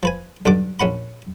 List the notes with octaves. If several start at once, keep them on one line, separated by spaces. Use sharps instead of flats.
F3 B4 G#5
B1 G2 D3 D6
A#1 C#4 F#5 B5